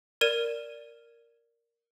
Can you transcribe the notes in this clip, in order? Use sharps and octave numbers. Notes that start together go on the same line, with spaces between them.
A#4 D5 G#6 D#7 E7